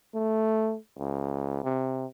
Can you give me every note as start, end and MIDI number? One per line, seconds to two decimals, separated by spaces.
0.14 0.76 57
0.98 1.63 37
1.63 2.06 48